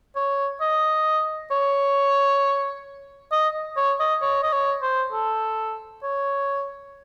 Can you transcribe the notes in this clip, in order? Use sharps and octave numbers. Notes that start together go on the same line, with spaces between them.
C#5
D#5
C#5
D#5
C#5
D#5
C#5
D#5
C#5
C5
A4
C#5